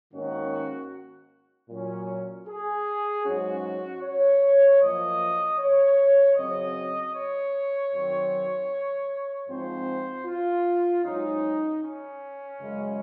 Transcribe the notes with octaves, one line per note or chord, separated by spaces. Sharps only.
G#2 D#3 A#3 C#4 F#4
A#2 F#3 C#4
G#4
G#2 F#3 C#4 F#4
C#5
F#2 F3 A#3 D#5
C#5
F#2 C#3 F#3 C4 D#5
C#5
F#2 D#3 F#3 C4
G#2 F3 C4 C5
F4
G#2 F#3 C#4 D#4
C#4
F#2 C#3 G#3